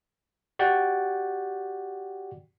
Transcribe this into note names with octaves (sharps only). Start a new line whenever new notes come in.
F#4 G4 D5 F#5 G5